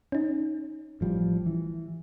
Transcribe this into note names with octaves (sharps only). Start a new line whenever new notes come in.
C#4 D#4
A1 F3 G3
E3